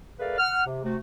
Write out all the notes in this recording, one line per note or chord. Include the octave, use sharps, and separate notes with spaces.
A3 G#4 A#4 B4 D5 F5
F#5 F6
C3
C3 A3 F#4